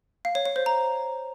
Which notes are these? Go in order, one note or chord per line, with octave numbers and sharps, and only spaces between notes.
F5
C#5
C#5
C5
A#5